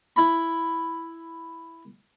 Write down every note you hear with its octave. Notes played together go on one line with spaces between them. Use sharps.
E4 B5